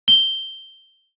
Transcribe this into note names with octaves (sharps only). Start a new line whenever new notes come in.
G7